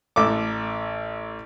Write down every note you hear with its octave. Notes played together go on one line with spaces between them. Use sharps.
A1 A4 D6